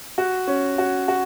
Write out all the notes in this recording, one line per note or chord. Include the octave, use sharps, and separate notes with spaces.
F#4
C#4
F#4
F#4